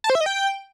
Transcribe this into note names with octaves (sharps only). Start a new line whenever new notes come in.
A5
C5
E5
D#5
G5